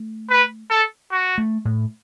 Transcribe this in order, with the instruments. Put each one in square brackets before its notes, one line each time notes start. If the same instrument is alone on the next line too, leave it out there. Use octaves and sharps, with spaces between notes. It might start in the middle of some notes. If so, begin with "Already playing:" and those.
Already playing: [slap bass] A3
[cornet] B4
A4
F#4
[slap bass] A3
A2